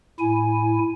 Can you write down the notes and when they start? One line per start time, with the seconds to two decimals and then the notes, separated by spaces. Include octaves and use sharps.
0.19 A2 E4 G#5